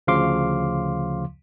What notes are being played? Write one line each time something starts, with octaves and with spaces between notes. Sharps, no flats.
D2 C#3 F3 F5 C6 D6